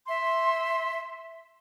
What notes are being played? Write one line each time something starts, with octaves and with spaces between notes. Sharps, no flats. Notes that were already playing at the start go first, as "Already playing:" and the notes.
E5 C6